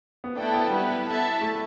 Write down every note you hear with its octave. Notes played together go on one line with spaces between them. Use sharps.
B3
A3 D4 E4 A4 G5
B3
G3 B3 E4 B4
E4 A4 E5 A5
A3